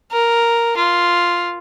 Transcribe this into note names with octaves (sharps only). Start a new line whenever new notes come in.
A#4
F4